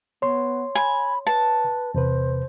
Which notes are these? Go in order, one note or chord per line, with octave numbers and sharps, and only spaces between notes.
B3 C#5 C6
G#5 B5
B4 A5
E2 C3 B4 C5